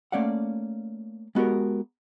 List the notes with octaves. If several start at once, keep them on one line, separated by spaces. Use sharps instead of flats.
A3 A#3 C#4 D5 F5 F#5
G#3 B3 F#4 G4 A#4